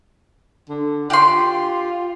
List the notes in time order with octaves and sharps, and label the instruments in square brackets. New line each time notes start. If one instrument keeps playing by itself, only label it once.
[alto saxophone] D3
[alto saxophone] F4 [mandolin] G4 C6